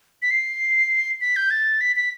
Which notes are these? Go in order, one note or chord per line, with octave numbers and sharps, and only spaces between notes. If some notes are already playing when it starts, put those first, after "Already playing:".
B6
C7
B6
G6
A6
B6
B6